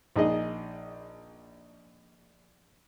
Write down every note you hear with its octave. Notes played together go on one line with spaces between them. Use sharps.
A#1 D#4 G#4 D#5